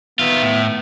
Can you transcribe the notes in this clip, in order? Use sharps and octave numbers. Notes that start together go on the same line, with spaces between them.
D#3 B3 F4 E5
A2